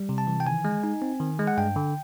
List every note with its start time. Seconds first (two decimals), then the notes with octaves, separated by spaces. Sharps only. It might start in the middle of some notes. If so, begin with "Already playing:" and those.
Already playing: G3
0.09 C3
0.18 A5
0.27 E3
0.40 G5
0.47 D#3 G#5
0.65 G#3
0.84 D#4
1.02 C4
1.20 D#3
1.39 G#3
1.47 F#5
1.58 G2 G5
1.76 D3